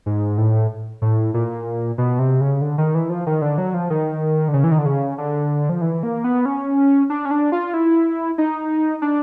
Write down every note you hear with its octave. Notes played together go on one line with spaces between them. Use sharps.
G#2
A2
A2
A#2
B2
C3
C#3
D3
D#3
E3
F3
D#3
D3
F#3
F3
D#3
D3
C#3
E3
D#3
D3
C#3
D3
F3
E3
A#3
B3
C#4
D4
C#4
D4
F4
E4
D#4
D4